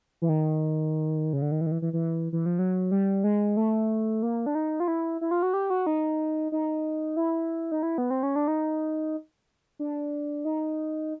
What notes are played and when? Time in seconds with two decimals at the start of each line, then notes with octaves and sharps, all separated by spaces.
0.22 E3
0.29 D#3
1.33 C#3
1.42 D3
1.51 D#3
1.61 E3
1.66 D#3
1.71 E3
1.82 E3
1.93 E3
2.33 E3
2.46 F3
2.59 F#3
2.91 G3
3.24 G#3
3.57 A3
4.22 A#3
4.46 D4
4.55 D#4
4.80 F4
4.88 E4
5.21 E4
5.31 F4
5.43 F#4
5.53 G4
5.70 F#4
5.87 D#4
6.52 D#4
7.17 E4
7.72 D#4
7.83 E4
7.98 B3
8.10 C4
8.23 C#4
8.36 D4
8.48 D#4
9.79 D4
10.45 D#4